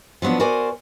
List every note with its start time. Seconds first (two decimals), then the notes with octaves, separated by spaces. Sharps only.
0.22 F3 F#3 B3 D4 E4
0.40 F#4 A#4 C5 D5 G#5